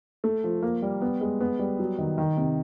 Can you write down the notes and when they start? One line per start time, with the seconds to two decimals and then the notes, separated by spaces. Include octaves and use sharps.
0.24 A3
0.44 F3
0.62 A#3
0.82 G3
1.01 B3
1.21 G#3
1.41 B3
1.59 G3
1.79 F#3
1.98 D#3
2.18 D#3
2.37 C3